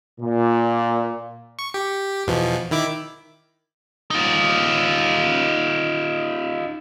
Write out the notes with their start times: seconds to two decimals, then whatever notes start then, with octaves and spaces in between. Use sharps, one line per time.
0.20 A#2
1.59 C#6
1.74 G4
2.27 E2 B2 F3
2.71 D#3 E4 D6
4.11 D#4 F4